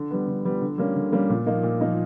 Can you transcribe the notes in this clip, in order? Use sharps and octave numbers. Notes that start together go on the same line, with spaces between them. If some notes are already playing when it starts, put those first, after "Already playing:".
Already playing: D3
G3 B3
D3
G3 B3
D3
G3 A#3 C#4
D3
G3 A#3 C#4
A#2
F3 A#3 D#4
A#2
F3 A#3 D#4